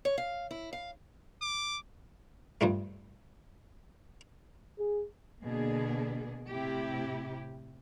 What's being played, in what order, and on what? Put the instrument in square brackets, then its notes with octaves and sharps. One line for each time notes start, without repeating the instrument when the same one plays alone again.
[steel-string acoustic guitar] C#5
F5
E4
F5
[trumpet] D6
[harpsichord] G2 F3 G3 A3
[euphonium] G#4
[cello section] B2 D3 A#3 B3 D4 G#4
A2 C3 E4 G4